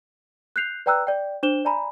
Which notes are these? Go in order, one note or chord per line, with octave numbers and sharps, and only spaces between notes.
F#6 G6 C7 F7
B4 D5 G5 A#5 E6 F#6
D5 G5
D4 C5 E7 G7
D5 G#5 A#5 B5